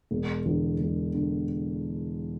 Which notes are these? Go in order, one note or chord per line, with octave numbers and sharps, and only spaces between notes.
E1
E2 D3
E1
D3